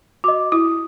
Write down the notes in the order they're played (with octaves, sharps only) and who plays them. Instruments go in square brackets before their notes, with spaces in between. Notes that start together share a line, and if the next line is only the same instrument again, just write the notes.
[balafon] F#4 [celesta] D#5 D6
[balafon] E4 [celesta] D#6